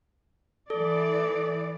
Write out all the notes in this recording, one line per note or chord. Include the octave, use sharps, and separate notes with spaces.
E3 A4 D5